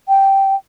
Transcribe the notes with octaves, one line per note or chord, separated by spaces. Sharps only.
G5